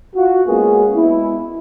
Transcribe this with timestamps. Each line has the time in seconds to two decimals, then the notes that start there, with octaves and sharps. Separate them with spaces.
0.15 F4 F#4
0.47 G#3 A#3 B3 C#4 G#4
0.95 G#3 B3 E4